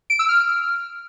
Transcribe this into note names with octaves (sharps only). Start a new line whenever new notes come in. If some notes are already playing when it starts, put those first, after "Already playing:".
D7
E6
F6